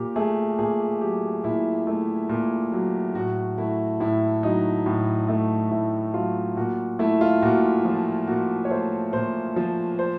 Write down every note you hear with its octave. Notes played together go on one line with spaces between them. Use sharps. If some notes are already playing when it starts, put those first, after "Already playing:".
Already playing: A#2 G4
A3 G#4
A#2 G#4
F#3 G4
A#2 E4
A3
A#2
F#3
A2 F#4
A3 E4
A2 E4
F#3 D#4
A2
A3
A2 E4
F#3 F4
A#2 F#4
A3 E4
F4
A#2 F#4
F3 F4
A#2 F#4
C#5
A3 C5
A#2 C5
F3
C5